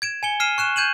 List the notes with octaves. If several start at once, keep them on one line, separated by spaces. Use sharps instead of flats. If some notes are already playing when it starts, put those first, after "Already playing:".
G#6 D7 E7
G#5 C#7 G7
F6 C7 D#7 E7
C#6 F#6 E7
G6 G#6 D#7 E7 F#7